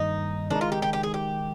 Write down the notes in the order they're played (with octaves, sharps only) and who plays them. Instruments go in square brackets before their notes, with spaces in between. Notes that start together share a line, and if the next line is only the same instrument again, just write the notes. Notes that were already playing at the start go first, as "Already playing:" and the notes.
Already playing: [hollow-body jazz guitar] G2 D#3 A#3 [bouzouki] D#4
[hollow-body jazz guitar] D#3 G#3 D#4 [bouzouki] D4
[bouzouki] F4
G4
G4
G4
G#4
G4